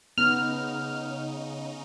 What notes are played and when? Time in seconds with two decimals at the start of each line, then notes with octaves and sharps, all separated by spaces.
0.18 C#3 B3 D#4 F6